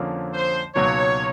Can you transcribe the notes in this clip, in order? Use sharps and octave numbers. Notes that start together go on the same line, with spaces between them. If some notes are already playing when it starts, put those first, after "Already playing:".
Already playing: F2 D3 F3 A#3 C#4
C5
C#2 B2 F#3 A#3 D#4 C#5